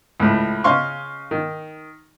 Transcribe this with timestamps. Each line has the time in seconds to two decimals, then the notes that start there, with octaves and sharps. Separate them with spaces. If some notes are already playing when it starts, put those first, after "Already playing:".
0.20 C#2 A2
0.64 C#3 C#4 D#5 F5 C6 C#6
1.31 D#3